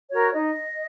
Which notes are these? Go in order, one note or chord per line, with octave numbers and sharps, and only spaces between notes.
F#4 A#4 C#5
D#4 D#5